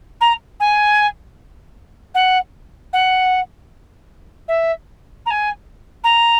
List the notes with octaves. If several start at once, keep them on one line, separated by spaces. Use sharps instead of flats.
A#5
G#5
F#5
F#5
E5
A#5
G#5
A#5